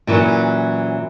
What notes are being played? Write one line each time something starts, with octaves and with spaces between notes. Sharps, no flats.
A#2 E3 F#3 C#4